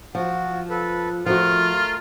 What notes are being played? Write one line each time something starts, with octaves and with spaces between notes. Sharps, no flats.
F3 F#4
A4 B4
F3 A3 F4 F#4 A#4